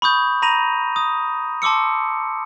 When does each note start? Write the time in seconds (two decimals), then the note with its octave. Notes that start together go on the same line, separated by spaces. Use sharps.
0.02 B5 C#6 D#6 G6
0.42 A#5 B5 A#6 D#7 F7
0.96 D#6
1.62 A5 C6 D6 E6 C#7